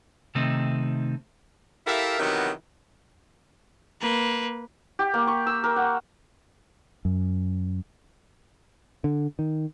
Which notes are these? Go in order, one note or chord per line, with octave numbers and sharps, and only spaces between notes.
C3 D#3 A3 C4 D#4
E4 G4 A4 A#4 E5 F5
C3 D#3 E3 F#3 B3 F#4
A#3 B4
G4
A#3
C#6
E6
A#4
F#5
F#2
D3
D#3